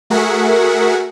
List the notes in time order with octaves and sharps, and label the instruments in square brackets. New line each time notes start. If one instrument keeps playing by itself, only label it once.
[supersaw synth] A3 F#4 G#4 A#4 E5 F#5